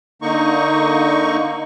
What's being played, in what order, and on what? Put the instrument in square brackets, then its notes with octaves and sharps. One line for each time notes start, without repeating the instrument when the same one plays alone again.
[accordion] D3 A#3 D#4 C#6